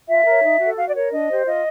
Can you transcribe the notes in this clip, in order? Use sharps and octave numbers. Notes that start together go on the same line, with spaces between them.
F4 E5
A#4 C#5
D#4
F#4 A4
F#4 F5
D5
A#4 C#5
D4 D#5
G4 C5
F4 D#5